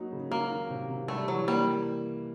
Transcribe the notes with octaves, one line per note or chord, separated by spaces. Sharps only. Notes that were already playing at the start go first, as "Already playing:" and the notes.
Already playing: F#3 A#3 D#4
C#3
F#3 A#3
D#3
C3
C3
G3 A3
E3 F#3
G3 A#3